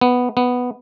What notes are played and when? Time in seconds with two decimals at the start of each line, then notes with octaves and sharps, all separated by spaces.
0.01 B3
0.37 B3